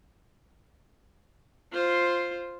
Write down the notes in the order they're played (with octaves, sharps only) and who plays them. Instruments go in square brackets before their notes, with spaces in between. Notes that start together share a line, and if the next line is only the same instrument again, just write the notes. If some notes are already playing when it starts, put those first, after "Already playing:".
[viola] F4 C5